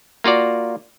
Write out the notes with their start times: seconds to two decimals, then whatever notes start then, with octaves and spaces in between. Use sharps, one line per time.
0.24 A#3 F4 F#4 D5